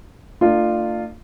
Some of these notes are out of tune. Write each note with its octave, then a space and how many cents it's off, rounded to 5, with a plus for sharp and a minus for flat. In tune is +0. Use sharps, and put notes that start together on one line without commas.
A3 +45 D4 +40 F4 -5